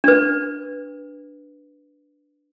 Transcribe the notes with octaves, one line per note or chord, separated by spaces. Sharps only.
D4 B4